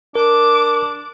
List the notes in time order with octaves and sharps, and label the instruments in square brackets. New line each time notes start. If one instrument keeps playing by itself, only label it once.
[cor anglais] D4 [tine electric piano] A#4 [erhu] D6